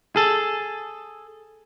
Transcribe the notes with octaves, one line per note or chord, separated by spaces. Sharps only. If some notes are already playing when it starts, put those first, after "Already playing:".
G#4 A4